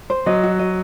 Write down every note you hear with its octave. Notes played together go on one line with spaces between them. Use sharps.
C5
F#3 D#5
F#4
D#5